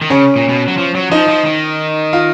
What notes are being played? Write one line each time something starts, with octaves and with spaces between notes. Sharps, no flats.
D#3
C#3 C#4
A#2
B2
F#3
F3
F#3
F3 D#4
F3
D#3
F4